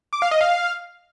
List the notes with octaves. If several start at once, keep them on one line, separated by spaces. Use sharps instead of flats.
D6
F5
D#5
F5